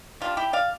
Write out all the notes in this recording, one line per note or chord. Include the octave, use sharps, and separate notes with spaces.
C3 G3 D4 F4
E4 G4
D5 F5